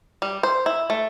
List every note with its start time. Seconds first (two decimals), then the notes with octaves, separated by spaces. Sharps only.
0.22 G3
0.43 C5
0.66 E4
0.90 A3